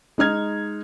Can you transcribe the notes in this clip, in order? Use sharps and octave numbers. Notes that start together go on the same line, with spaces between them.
G#3 D#4 F6 G#6